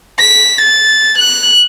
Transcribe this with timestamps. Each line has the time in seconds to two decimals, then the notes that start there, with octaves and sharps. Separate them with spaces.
0.19 B6
0.61 A6
1.18 F#6